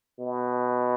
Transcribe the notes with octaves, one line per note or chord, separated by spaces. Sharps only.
B2